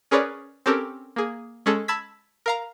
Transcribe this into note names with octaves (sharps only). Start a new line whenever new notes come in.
C#4 G#4 A#4 B4 C#5 D5
C4 C#4 G4 A4 A#4
A#3 G#4
G#3 C#4 G#4 A4
A5 B5 E6 G#6 B6
A#4 F5 A#5